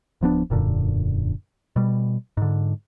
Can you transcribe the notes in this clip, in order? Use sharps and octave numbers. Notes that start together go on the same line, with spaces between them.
D1 F3 B3 D4
E1 F#2 A#2 D3
B2 G3
G#2 D3